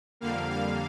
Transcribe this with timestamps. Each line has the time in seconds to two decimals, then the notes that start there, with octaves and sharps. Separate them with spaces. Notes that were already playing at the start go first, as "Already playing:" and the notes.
0.21 F2 D3 G3 A#3 F5
0.51 F5